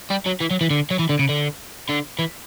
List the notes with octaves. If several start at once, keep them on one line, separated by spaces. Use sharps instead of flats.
G3
F#3
E3
F#3
E3
D3
F#3
E3
D3
C#3
D3
D3
E3